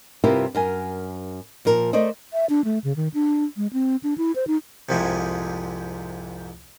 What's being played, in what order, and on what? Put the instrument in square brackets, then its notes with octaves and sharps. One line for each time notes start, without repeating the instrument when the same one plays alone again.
[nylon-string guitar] G2 C3 E4 F4 G4 A#4
F#2 A#4 G#5
A#2 F3 A#4
A3 A#4 C5 D5 D#5
[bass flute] E5
D4
A3
C#3
D#3
D4
G#3
C4
D4
E4
C5
D#4
[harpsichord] C2 F2 G#2 C3 F3 G#3